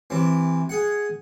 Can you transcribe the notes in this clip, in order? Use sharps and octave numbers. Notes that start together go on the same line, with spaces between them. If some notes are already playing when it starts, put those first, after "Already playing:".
C3 E3
G#4 F#5